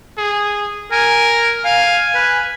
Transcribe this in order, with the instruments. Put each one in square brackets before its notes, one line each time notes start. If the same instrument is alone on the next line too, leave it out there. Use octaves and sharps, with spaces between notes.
[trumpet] G#4
[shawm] A#4 [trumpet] G#5
[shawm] F5 [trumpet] G#5
[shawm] B4